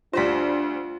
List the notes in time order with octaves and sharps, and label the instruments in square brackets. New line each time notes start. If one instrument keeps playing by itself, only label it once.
[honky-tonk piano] D2 G3 C5 [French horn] D4 [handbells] F4 B6